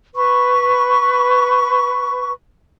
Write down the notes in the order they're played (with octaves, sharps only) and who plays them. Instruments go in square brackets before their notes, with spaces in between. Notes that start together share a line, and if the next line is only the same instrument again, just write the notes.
[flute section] B4 C#6